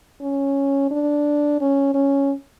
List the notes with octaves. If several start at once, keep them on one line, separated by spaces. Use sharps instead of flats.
C#4
D4
C#4
C#4